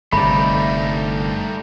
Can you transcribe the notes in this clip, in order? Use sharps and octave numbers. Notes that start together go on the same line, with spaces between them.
G1 C3 G3 A3 D#4 D5 B5